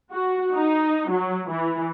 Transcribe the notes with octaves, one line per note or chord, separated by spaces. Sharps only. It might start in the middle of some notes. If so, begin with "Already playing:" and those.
F#4
D#4
F#3
E3